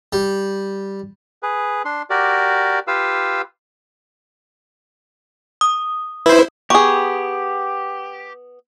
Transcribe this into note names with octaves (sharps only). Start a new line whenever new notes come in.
G3
G#4 B4
D4 C6
F#4 G4 A#4 D5
F4 G4 B4 F5 E6
D#6
E4 B4 C5
B3 G4 G#4 C#6